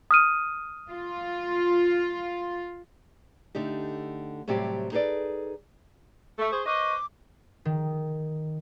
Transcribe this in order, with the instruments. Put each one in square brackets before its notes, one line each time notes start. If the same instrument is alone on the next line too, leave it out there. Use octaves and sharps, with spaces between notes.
[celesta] D#6 F6 D#7
[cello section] F4
[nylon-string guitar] D3 A3 D#4 G4
A2 C3 F#3 G3 C4 G4
D#4 G#4 A4 B4 D5
[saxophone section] A3 [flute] C#6
[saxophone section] G#4 C5
[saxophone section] B4 C5 D#5 [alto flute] C#6 [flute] D6
[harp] D#3